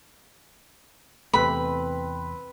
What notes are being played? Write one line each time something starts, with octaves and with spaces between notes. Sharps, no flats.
E2 C3 A3 C4 B4 B5